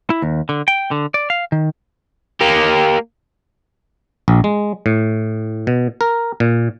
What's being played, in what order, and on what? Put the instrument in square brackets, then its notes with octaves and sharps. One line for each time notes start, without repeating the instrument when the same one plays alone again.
[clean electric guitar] E4
D#2
D3
G5
D3
D5
F5
D#3
[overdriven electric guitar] A#3 G4
[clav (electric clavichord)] A#1
G#3
A2
B2
A#4
A#2